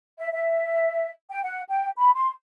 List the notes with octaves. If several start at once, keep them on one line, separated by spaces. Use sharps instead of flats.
E5
E5
G5
F#5
G5
B5
C6